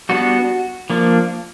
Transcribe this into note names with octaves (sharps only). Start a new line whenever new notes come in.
G3 B3 D4 F#4
F3 A#3 D4